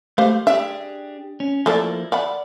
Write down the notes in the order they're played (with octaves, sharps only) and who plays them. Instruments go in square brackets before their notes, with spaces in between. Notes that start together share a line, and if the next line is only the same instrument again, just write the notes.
[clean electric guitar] A3 [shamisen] G4 C5 F5
[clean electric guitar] D4 G4 G#4 [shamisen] E5
[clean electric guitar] C#4
[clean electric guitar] F3 A#3 E4 [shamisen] A3 A4 D5
[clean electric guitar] D5 [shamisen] E5 F#5 B5